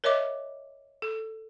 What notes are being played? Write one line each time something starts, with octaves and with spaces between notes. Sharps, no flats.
A#4 C#5 D#5 E5 D6
A4